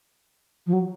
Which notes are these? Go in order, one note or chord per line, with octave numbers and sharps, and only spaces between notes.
F3
F#3